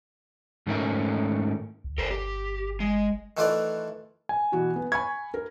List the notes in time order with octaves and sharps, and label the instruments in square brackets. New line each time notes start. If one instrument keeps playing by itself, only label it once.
[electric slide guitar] G#2 D#3 A3 C#4 A#4 E5
[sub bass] D2
[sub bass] G1 [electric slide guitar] A4 A#4 C5
[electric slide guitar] G4
G#3
[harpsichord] D#3 E3 A3 F4 B4 D5
[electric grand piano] G#5
[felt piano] B2 E3 F#4
B3
[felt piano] G#5 B5 C#6 [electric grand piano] G#6
[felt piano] A#4